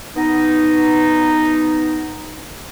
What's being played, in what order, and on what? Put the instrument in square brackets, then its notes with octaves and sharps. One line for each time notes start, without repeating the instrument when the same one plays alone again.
[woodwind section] B3 D#4